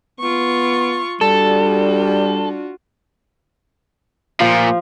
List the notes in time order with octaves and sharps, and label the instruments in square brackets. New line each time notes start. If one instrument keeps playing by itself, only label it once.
[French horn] B3 [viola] F4 C#6
[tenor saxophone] G3 [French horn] D4 [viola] F4 F#4 [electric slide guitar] A4
[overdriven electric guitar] A#2 [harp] F3